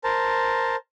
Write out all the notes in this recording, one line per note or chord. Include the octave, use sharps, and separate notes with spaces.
A#4 C5 A5